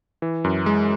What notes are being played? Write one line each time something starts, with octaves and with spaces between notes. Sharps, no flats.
E3
F#2
G#3